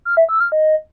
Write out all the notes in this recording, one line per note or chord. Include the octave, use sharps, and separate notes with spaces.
F6
E5
E6
F6
D#5